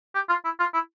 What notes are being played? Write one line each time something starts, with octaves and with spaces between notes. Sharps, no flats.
G4
F4
E4
F4
E4